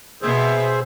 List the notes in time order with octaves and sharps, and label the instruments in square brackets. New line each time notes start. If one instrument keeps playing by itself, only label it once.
[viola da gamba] B2 B3 [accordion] G#4 C5 E5